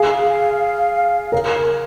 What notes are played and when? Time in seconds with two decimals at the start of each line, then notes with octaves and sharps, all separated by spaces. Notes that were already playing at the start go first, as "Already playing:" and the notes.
Already playing: G#4 F5
1.32 A#4